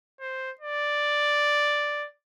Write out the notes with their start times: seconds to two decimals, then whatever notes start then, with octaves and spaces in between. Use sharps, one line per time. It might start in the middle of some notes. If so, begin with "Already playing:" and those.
0.20 C5
0.61 D5